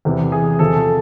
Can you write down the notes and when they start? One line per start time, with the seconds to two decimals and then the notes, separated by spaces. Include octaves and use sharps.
0.05 E2 C3 E3
0.32 G#4
0.59 E2 C3 F3 A4